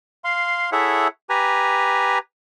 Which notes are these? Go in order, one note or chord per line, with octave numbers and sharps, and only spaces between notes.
F5 C6
E4 G#4 A4 C#5 E5 F#5
G4 B4 G#5 A#5